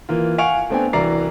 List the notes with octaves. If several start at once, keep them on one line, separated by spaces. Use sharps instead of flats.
E3 A#3 F4
F5 F#5 G#5 C#6 D7 F7
A3 B3 C4 D4 G5 G#5
C2 E3 F#4 D5 A#5 C7